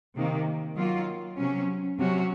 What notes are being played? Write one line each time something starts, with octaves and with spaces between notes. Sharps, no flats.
C3 D#3 A#3
D#3 F#3 A#3 F4
C3 F#3 C#4
C3 F#3 C#4 F#4